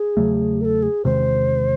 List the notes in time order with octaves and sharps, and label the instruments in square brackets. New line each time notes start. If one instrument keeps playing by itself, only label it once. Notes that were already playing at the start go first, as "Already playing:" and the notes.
Already playing: [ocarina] G#4
[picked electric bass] E2 C#3 F#3 A3
[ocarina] A#4
A4
G#4
[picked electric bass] E2 C3 D#3 G#3 [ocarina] C5